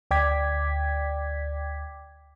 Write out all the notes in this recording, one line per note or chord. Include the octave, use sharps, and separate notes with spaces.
D2 D5 G5 D6 G#6 B6